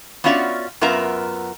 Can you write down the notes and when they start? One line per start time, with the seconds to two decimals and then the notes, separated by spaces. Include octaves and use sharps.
0.24 B3 C#4 F4 F#4 D5 E5
0.81 F#2 B3 F4 A#4 E5 A#5